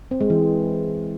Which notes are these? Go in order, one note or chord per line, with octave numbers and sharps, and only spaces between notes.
C4
G#3
E3